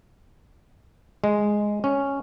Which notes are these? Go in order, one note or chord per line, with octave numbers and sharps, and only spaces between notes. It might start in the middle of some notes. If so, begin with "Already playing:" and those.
G#3
C#4